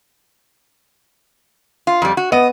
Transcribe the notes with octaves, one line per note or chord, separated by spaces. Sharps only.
F4
F2 G3
F#4
B3 D#5